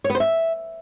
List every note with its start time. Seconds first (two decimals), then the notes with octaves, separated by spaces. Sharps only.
0.04 C#5
0.10 B3
0.15 C5
0.20 E5